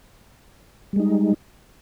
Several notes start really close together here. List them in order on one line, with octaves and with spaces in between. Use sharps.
G3 G#3 D#4